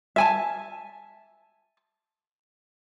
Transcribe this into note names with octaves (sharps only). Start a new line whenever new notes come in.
E5 G#5 A5